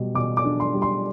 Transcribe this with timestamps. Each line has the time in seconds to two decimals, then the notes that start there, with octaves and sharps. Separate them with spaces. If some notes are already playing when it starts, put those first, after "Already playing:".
Already playing: B2 G3
0.15 B2 D6
0.37 D6
0.45 D4
0.60 C6
0.74 G3
0.82 C6